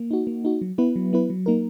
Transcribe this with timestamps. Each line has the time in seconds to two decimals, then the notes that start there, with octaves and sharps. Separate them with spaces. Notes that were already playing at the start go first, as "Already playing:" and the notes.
Already playing: A#3
0.11 D#4 F#4
0.27 A#3
0.45 D#4 F#4
0.61 F#3
0.78 B3 E4 B4
0.96 F#3
1.13 B3 E4 B4
1.30 F#3
1.46 A#3 D#4 A#4